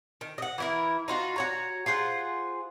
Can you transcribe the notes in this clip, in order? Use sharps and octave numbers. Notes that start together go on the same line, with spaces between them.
D#3
D#5 F#5
E3 E4 A#4
D#4 F4 F#4
F#4 C#5 A#5
F4 G#4 C5 F#5